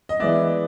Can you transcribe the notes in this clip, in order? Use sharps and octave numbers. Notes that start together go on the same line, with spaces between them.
D#5
E3 G#3 B3 D5 E5